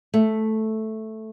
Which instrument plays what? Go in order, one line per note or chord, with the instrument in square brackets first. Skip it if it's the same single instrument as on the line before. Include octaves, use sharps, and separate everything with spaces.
[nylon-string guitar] A3